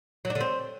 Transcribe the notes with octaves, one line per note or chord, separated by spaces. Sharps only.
F#3
D4
D3
C4